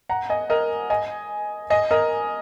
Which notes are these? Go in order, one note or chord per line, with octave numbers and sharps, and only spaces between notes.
F#5 A#5
D#5 G#5
A#4 D#5
D#5 G#5
D#5 G#5
A#4 D#5